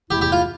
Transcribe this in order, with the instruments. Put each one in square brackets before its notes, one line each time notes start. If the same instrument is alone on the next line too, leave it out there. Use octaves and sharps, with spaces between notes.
[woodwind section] E2 E3 A3 E4 [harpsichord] G4
[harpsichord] G4
F4